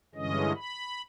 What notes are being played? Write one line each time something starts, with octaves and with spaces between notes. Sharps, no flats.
G2 D3 E3 G#3 C#4 D#5
B5